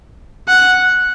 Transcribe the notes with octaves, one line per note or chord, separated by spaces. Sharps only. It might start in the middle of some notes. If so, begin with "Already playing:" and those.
F#5